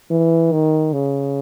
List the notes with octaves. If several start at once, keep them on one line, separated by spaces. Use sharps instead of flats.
E3
D#3
C#3